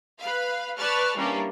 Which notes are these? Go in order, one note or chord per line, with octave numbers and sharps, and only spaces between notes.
B4 F5
B4 D5 A5 C#6 F6
E3 G3 A#3 C#4 D4